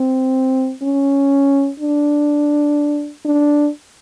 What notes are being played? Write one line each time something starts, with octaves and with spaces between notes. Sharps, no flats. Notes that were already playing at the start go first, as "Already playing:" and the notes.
Already playing: C4
C#4
D4
D4